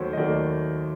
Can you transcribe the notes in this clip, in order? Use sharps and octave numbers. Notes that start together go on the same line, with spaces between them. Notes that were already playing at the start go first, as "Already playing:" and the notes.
Already playing: D#2 D#3 F#3 A3 C5 C#5
D#5
D#2 D#3 F#3 A3 D5